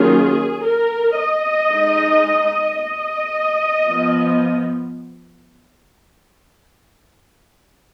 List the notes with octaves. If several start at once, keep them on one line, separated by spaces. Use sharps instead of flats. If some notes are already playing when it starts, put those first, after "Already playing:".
Already playing: D#3 F#3 A#3 C#4 F4 G#4
A#4
D#5
G#3 D#4
D#5
F3 B3